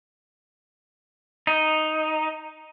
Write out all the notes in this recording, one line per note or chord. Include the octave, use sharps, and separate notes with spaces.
D#4